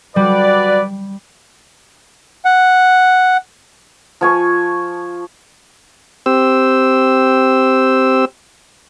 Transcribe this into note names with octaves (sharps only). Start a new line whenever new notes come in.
G3 F#4 B4 D5
F#5
F3 G#5 C#6
C4 G4 C5 E6